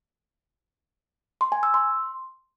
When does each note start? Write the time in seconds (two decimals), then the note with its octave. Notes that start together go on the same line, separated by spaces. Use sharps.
1.41 C6
1.52 G#5
1.63 E6
1.74 C6